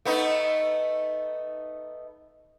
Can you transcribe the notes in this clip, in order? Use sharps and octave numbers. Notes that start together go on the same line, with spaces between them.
A3 B3 D#4